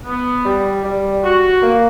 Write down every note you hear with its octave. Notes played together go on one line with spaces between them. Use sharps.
B3
G3
G3
F#4
A#3